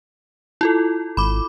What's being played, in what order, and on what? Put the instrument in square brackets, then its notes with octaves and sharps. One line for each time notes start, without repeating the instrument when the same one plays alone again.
[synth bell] E4 F4 A4
[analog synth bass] G#1 [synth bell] B5 D6